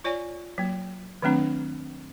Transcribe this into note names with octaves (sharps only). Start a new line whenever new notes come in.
F4 C#5 D5 G#5 C#6
F#3 A#3
D#3 F#3 A3 C4 D4